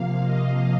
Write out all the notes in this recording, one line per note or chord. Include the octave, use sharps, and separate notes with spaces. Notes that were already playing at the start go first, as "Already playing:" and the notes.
Already playing: C3 F3 A#3 F5
D#5